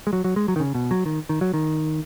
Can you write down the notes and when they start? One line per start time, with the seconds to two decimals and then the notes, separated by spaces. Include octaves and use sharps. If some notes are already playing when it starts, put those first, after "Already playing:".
0.07 G#3
0.13 F#3
0.24 F#3
0.36 G#3
0.48 F#3
0.56 D#3
0.60 C#3
0.74 B2
0.91 F#3
1.06 D#3
1.29 D#3
1.41 F#3
1.54 D#3